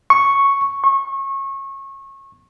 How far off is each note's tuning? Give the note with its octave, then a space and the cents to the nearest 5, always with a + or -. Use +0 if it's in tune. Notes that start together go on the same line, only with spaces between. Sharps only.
C#6 +0
C#6 -25